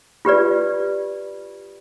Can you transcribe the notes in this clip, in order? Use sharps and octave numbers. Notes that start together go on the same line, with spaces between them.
F4 G4 B4 D5